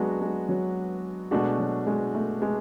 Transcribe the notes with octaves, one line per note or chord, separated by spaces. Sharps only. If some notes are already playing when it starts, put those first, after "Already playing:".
Already playing: F#3 G#3 B3 D4 F#4
G#3
F#3
B2 G#3 A3 D4 F#4
F#3
G#3
A3
G#3